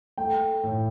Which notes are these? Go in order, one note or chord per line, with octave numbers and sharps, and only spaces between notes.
A3 G5
A2